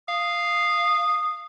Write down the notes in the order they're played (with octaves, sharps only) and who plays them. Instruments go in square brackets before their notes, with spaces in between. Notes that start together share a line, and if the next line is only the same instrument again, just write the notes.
[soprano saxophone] F5 [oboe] D#6